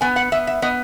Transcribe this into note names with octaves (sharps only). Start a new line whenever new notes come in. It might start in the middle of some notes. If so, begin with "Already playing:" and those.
B3 G#5
F#5
B3 E5
E5
B3 D#5